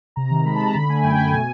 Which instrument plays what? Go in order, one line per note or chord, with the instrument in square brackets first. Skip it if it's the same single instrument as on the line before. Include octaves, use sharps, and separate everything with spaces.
[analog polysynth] C3 A#5
D#3
G#3 B5
C3 A5
A#5
D3 B5
A3 G#5
F#2 G5
A3 G#5
B2